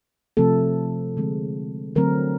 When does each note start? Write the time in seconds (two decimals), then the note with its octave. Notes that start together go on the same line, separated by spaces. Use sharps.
0.37 C3 F3 A3 C4 A4
1.17 D3 F3 G#3 C4
1.95 D3 F#3 A3 C4 A#4